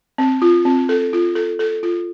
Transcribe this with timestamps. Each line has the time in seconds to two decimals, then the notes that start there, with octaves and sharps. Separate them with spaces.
0.18 C4
0.42 F4
0.65 C4
0.89 A4
1.13 F4
1.35 A4
1.59 A4
1.83 F4